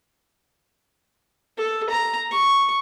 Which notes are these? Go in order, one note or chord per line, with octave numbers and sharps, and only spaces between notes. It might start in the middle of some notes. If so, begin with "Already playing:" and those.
A4
A#5
C#6